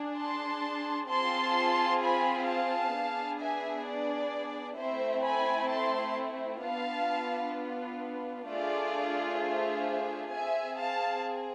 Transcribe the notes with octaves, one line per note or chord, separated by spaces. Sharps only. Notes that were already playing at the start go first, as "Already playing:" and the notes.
Already playing: D4 G#4
A5 C6
C4 F4 G#4 A5 C6
G#5 B5
F5 A5
B3 D4 G#4
E5 G#5
D5
A3 C4 E4 C5 E5
G#5 B5
A5 C6
B3 D4 F4 F5 A5
A3 D4 F4 G#4 D5
C5 E5
C4 G#4 E5 G#5
F5 A5